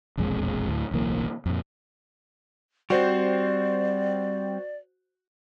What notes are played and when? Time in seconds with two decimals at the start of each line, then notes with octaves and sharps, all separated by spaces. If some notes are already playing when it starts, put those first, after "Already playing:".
0.18 E1 A#1 F2 G#3
0.68 D2 A2
0.91 D1 B1 E3 A#3
1.46 F2 A#2
2.90 G3 C4 F#4 C5 D5